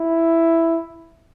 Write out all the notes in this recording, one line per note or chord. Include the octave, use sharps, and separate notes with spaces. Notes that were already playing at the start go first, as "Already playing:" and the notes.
Already playing: E4